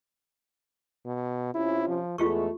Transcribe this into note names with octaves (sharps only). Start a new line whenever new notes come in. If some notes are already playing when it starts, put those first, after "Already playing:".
B2
C3 C#4 E4 F4
F3
E2 G#3 A3 F4 G4 C#6